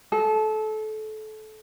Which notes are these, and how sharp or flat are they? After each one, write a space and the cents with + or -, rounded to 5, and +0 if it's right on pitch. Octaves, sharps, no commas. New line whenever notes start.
A4 -25